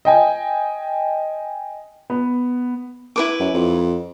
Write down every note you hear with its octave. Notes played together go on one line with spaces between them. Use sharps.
D#5 G5 G#5
B3
E4 B4 D6
F#2
F2